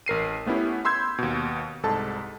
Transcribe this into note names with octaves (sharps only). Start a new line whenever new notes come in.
A1 A#4 C7 D#7
A3 B3 C#4 E4 G4
B5 C6 E6 G6 G#6
D#2 B2
C2 G#2 A4 A5